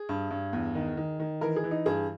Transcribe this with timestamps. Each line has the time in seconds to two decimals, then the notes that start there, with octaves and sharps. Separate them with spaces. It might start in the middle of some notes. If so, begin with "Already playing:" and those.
Already playing: G#4
0.09 G2
0.31 G2
0.53 E2
0.75 D#3
0.97 D#3
1.20 D#3
1.41 E3 A#4
1.56 G#4
1.64 E3
1.71 D#4
1.86 G2 G#4